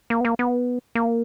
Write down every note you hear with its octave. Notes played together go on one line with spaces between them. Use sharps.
A#3
B3
A#3
B3
A#3